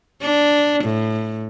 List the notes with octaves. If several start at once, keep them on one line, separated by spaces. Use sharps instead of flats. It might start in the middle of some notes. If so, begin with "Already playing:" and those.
D4
A2